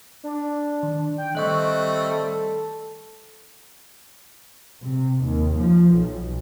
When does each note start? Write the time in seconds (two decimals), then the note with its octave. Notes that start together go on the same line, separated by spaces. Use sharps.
0.24 D4
0.83 D#3
1.18 G5
1.35 D#3 G3 A3 C4 D#5 C#6 F#6
2.09 A4
4.81 C3
5.22 D#2
5.56 F3
5.94 B1